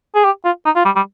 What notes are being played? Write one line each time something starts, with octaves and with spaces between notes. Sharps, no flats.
G#4
G4
F4
D#4
F4
G3
G3